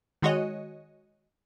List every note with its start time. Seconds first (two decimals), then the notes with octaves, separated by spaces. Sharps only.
0.22 D#3 G#3 F#4 C#5 D#5